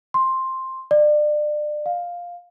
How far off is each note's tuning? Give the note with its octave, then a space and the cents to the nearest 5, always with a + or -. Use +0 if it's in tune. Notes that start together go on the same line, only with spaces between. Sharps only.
C6 +10
D5 +30
F5 +5